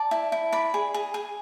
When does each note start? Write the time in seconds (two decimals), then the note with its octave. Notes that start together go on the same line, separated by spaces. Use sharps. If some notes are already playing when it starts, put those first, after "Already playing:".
Already playing: D5 A5
0.11 E4
0.32 E4
0.52 D5 B5
0.74 G#4
0.94 G#4
1.14 G#4